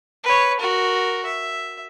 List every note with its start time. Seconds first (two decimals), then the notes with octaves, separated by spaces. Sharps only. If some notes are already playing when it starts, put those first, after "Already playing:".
0.24 B4 C#5
0.60 F#4 A#4
1.25 E5